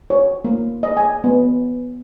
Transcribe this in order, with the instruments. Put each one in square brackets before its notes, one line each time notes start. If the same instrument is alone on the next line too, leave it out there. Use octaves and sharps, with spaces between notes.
[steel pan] C#5
A#3
D#5
G#5
B3